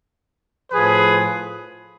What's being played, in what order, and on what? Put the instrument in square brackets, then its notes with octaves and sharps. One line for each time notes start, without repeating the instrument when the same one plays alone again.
[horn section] A2 F3 G#4 B4